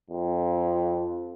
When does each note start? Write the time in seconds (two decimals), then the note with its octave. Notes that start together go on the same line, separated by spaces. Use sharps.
0.11 F2